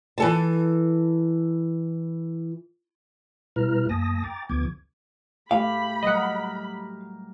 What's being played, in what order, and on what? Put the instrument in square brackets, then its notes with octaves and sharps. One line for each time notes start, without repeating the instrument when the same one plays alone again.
[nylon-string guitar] E3 A4 A5
[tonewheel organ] B2 G3 E4 B4 A#5 F6
F#2 A#3 G#5 A5 D#6 A#6
G5 A#5 D6 A6
D2 D3 F3 B3 D6 G#6
[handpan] A3 G4 [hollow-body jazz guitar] F5 [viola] B5
[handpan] F#3 G3 A#4 [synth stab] D#5 F#5